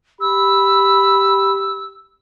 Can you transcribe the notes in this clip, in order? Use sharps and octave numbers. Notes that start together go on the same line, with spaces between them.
G4 B5 E6